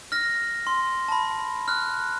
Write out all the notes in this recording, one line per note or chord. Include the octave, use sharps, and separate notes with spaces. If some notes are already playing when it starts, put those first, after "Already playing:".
F6 A#6
C6
A5 B5
F6 F#6